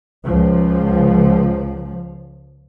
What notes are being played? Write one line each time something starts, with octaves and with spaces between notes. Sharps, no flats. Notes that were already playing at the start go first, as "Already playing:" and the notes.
C#2 F3